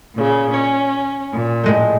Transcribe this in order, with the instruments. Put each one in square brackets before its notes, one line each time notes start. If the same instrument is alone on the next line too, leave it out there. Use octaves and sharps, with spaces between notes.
[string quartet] A#2 C#3
[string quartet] C#4 [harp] C#5
[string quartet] A#2
[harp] A2 G#3 A3